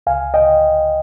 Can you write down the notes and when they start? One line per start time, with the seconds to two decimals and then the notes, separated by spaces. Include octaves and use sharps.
0.07 C#2 F5 G#5
0.34 D#5 G5